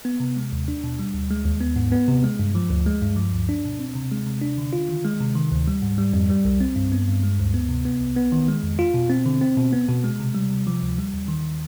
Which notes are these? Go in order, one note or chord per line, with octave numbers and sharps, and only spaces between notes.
B3
C3
G#3
D#2
D4
B2
G3
D2
G#3
D#2
B3
G#2
B3
C3
G#3
G2
F3
D2
G#3
G2
F3
D2
D4
B2
C4
C3
G#3
C3
D4
D3
F4
D#3
G#3
C3
D#3
D2
G3
G#2
G3
F2
G3
C2
C4
G2
B3
G2
G#3
D2
B3
C3
B3
C2
B3
D#3
G#3
F2
F4
B2
C4
D3
C4
B2
B3
B2
G#3
C3
G3
C3
F3
D2
G3
D#2
D#3